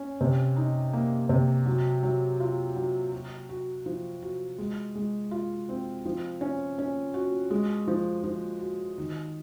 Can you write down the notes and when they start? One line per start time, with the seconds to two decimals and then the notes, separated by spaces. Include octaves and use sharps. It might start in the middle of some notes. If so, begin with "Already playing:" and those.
Already playing: C#4
0.21 C3
0.57 D#4
0.93 A#3
1.29 C3
1.66 F#3
2.03 F#3
2.40 F4
2.76 F#3
3.12 F#4
3.49 F#4
3.86 F3
4.22 F#4
4.58 G#3
4.95 G#3
5.31 F4
5.69 C4
6.05 F3
6.41 C#4
6.79 C#4
7.14 F#4
7.50 G#3
7.87 F3
8.24 F3
8.60 F#4
8.98 D#3